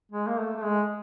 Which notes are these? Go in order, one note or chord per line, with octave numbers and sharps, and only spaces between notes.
G#3
A#3
A3
A3
G#3